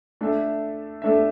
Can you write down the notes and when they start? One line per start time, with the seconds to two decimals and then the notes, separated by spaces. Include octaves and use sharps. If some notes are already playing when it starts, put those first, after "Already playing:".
0.21 A3 D4 A4 E5
1.02 A3 D4 A4 E5